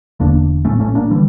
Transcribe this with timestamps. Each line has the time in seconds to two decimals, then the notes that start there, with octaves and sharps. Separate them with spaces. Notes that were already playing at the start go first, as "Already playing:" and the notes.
0.20 E1 E2 D3 A#3 D4
0.65 A#1 A2 A3 C#4
0.80 A3 C#4
0.95 A#3 D4
1.10 D3 E3 G3